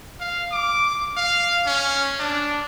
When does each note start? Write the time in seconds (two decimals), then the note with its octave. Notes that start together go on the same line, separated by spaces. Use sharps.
0.20 F5
0.52 D6
1.17 F5
1.67 C#4
2.19 D4